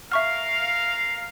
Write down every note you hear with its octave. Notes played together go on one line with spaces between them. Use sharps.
A#4 E5 F5 C#6 F6